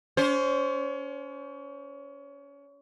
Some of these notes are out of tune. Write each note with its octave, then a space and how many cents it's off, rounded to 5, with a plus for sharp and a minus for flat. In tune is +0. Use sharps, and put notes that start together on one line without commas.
C#4 +30 C5 +5